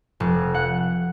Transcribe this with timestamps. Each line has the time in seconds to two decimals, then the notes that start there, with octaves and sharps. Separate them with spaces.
0.20 F1
0.54 F#5